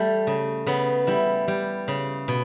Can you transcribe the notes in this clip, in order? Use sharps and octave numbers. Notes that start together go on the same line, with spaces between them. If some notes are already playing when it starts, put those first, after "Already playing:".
Already playing: G3 A3
C#3
C#3 B3
G3 E4
G3
C#3
B2